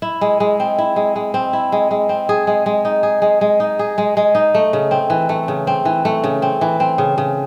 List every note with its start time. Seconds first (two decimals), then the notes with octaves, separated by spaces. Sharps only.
0.02 E4
0.21 G#3
0.40 G#3
0.60 C4
0.78 E4
0.96 G#3
1.16 G#3
1.34 C4
1.53 E4
1.72 G#3
1.91 G#3
2.09 C4
2.29 G#4
2.47 G#3
2.66 G#3
2.85 D#4
3.03 G#4
3.22 G#3
3.41 G#3
3.60 D#4
3.79 G#4
3.98 G#3
4.17 G#3
4.35 D#4
4.55 A3
4.73 C#3
4.91 C4
5.10 E3
5.29 A3
5.48 C#3
5.67 C4
5.85 E3
6.05 A3
6.24 C#3
6.42 C4
6.61 E3
6.80 C4
6.98 C#3
7.18 C#3